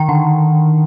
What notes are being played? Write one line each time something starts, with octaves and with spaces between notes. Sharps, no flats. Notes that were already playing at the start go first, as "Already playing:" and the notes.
Already playing: D#3
D3